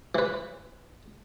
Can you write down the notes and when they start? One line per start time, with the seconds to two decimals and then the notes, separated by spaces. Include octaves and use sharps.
0.15 E3 B4